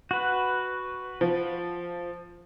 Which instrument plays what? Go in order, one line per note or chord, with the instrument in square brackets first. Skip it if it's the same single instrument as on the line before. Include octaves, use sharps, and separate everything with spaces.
[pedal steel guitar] F#4 B4
[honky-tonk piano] F3